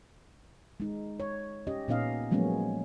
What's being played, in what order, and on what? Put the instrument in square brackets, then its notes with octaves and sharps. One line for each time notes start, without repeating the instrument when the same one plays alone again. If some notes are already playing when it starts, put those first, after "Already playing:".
[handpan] G#3 D#4
C#5
C#4 G4 D#5
A#2 B3 C#4 D#4 D#5 F5
F3 F#3 G#3 A#3 B3 C#4